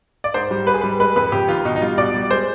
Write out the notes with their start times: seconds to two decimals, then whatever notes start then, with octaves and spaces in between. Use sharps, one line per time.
0.24 D5
0.34 G#2 C5
0.51 G3
0.67 G#2 B4
0.74 G#4
0.81 G3 B4
1.00 G#3 B4
1.16 F2 B4
1.32 F2 G4
1.49 D#3 F4
1.65 B2 D#4
1.76 D#4
1.81 G3 F4
1.98 B2 D5
2.14 G3
2.31 G#3 C5